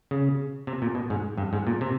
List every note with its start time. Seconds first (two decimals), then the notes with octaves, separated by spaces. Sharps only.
0.11 C#3
0.67 C3
0.82 A#2
0.95 B2
1.10 G#2
1.38 G2
1.53 G#2
1.67 A#2
1.81 C3